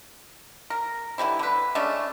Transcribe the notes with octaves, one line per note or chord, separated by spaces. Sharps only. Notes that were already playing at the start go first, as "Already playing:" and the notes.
A#4
D3 E3 G3 E4
D3 B4
G#3 A3 C#4 D4